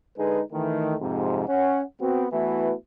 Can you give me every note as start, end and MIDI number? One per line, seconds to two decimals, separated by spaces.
0.18 0.41 50
0.18 0.41 56
0.18 0.41 63
0.18 0.41 68
0.18 0.41 71
0.53 0.96 51
0.53 0.96 52
0.53 0.96 57
1.01 1.46 41
1.01 1.46 44
1.01 1.46 48
1.47 1.82 61
1.47 1.82 73
1.47 1.82 78
2.01 2.26 59
2.01 2.26 60
2.01 2.26 66
2.32 2.73 52
2.32 2.73 57
2.32 2.73 59
2.32 2.73 64
2.32 2.73 66
2.32 2.73 71